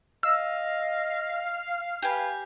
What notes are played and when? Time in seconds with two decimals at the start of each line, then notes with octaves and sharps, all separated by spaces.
0.23 D#5 F5 E6
2.02 G4 B4 G#5